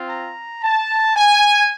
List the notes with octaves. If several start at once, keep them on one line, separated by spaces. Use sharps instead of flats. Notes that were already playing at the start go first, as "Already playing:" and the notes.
Already playing: C4 F4
A#5
A5
G#5